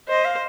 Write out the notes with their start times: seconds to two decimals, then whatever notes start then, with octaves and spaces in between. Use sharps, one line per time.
0.08 C5 D#5
0.25 F5